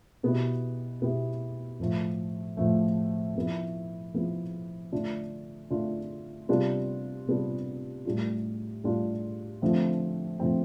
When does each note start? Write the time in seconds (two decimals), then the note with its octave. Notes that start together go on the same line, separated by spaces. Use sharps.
0.23 B2 B3 E4 G4
1.01 B2 B3 E4 G4
1.80 A2 F3 A3
2.57 A2 F3 A3
3.35 F3 B3 E4
4.14 F3 B3 E4
4.92 D3 A3 D4 F4
5.70 D3 A3 D4 F4
6.49 C3 G3 B3 D4 F4
7.27 C3 G3 B3 D4 F4
8.05 A2 G3 D4 F4
8.84 A2 G3 D4 F4
9.62 D3 F3 A3 C4
10.40 D3 F3 A3 C4